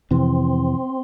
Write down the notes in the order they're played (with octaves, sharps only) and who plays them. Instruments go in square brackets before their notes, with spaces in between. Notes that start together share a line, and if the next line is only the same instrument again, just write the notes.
[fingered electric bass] F2 C3 E3 [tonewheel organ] C4